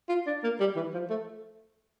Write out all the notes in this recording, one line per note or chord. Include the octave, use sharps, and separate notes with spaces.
F4
D4
A#3
G3
E3
F3
A3